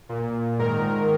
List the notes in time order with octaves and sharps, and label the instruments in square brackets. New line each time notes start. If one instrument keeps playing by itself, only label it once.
[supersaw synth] A#2
G#2 D#3 A#4